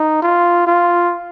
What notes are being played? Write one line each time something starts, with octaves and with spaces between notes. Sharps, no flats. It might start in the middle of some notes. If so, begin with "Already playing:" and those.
Already playing: D#4
F4
F4